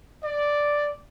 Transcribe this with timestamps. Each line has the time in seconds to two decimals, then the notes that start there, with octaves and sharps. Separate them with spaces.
0.23 D5